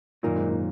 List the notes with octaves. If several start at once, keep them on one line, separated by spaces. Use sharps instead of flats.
F#2 A#2 D#3 A#3 D#4
G#2
A#2